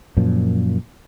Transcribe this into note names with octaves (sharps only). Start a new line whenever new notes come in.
F#2 A#2 F3